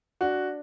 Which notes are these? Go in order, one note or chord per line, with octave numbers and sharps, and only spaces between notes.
D4 F#4